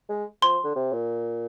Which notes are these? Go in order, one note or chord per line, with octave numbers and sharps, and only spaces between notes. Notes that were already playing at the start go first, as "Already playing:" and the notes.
G#3
F3 C6
D3
C3
A#2